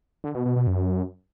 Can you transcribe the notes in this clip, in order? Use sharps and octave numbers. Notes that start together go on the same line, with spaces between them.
D3
B2
B2
B2
F#2